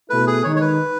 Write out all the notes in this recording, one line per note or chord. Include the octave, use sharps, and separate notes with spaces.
B2 A3 E4 A4 B4
G#4
D#3 G#3 D#4 C#5
C#5
B4